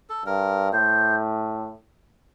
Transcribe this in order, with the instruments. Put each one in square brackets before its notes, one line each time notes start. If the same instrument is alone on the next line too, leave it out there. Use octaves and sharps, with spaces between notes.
[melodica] A4
[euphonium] G2 [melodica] A#4
[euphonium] A2 [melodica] C5